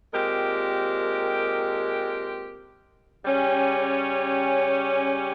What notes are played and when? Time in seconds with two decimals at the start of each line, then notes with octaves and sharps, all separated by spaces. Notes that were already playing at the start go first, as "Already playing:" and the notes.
0.13 A#2 G#3 C4 G4 A#4
3.24 C#3 G3 C#4 G4